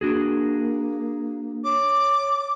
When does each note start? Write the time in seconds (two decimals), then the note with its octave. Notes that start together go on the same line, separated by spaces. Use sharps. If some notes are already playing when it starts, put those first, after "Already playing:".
0.01 A#3 D4 F#4 G#4
1.64 C#5 D6